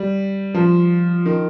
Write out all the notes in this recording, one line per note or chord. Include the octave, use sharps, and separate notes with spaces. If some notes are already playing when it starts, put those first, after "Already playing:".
Already playing: G3
F3
D#3